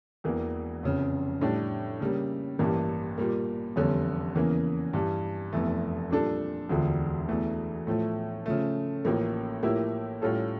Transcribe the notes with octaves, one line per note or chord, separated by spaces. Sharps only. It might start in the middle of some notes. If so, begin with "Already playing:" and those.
E1 E2 E3 A#3
F1 F2 C#3
A2 G3 D4
C#3 G3 A#3
A1 G2 E3 G3 A#3
A#2 G3 A#3
F1 E2 D3 G3 C#4
E2 C#3 E3 A#3
G2 E3 G3
F1 E2 E3 A3
A#2 G3 D4 A4
E1 D2 D3 F3
E1 E2 E3 A3
A2 F3 A3
C#3 F3 A3
A1 A2 F3 A#3
A2 F3 A#3 E4 G4
A2 G3 C#4 F4 A4